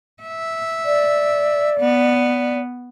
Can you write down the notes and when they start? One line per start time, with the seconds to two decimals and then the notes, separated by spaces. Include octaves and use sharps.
0.23 E5
0.85 D5
1.80 B3